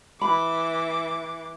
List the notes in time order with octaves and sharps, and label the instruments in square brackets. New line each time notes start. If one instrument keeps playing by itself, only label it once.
[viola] E3 D6 [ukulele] B5